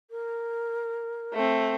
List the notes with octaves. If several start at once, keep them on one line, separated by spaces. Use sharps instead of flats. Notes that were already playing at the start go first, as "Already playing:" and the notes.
A#4
A3 C4